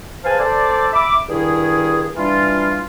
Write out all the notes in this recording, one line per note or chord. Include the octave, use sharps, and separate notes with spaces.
G#4 B4 C5 F5 G#5 A5
A4 C5 D5
E5 B5 D6
G2 D#3 E4 G#4
E3 G3 D4 F4